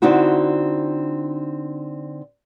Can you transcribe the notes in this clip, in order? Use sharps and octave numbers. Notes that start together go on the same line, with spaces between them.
D3 C4 D#4 E4 F#4